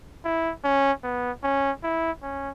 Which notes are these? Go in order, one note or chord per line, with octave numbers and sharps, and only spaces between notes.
E4
C#4
B3
C#4
E4
C#4